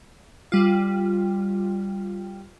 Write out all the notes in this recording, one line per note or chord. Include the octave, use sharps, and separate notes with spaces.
G3 F4